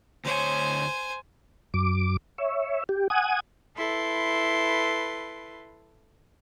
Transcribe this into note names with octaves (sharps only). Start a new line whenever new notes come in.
D2 C5 C#5 G#5
F#2 D6
C#5 E5
G4
F#5 G#5 D#6
E4 A4 B4 C6